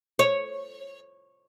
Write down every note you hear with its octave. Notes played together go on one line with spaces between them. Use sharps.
C#5